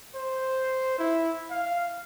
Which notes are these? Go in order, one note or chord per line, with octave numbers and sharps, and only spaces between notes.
C5
E4
F5